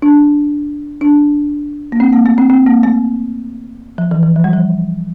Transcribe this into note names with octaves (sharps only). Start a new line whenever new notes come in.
D4
D4
A#3
C4
A#3
A3
C4
C4
A#3
A3
F3
E3
E3
F3
G3
F3